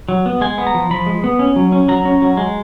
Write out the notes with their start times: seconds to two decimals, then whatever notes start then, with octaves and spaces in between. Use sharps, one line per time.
0.09 F#3
0.26 B3
0.41 G#3 G#5
0.58 B3
0.67 A#5
0.74 F3
0.91 F3 B5
1.06 G#3
1.24 B3
1.39 C#4
1.56 F#3
1.72 C#4
1.88 F#3 A#5
2.05 C#4
2.22 F#3
2.37 G#3